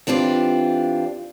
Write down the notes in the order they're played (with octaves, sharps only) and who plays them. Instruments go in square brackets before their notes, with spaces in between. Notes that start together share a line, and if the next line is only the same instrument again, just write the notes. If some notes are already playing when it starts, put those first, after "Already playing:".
[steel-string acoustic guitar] E3 C4 D4 F4 G4